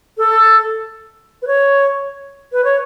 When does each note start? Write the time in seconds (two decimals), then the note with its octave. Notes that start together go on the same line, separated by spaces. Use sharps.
0.18 A4
1.42 B4
1.47 C#5
2.52 B4
2.64 C#5